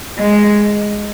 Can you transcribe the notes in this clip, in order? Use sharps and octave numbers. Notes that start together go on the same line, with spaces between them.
G#3